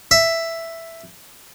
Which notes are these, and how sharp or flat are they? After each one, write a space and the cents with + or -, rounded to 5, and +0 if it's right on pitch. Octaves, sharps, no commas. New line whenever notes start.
E5 +5